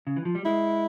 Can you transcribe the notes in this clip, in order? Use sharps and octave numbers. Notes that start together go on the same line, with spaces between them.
C#3
E3
F3
G3
G#3 E4